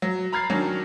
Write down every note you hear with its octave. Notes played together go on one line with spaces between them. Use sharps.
F#3
A#5 B5 F6 G#6 A6 C7
D#3 F#3 C#4 D4